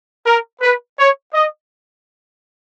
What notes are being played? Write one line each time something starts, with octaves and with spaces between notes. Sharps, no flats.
A#4
B4
C#5
D#5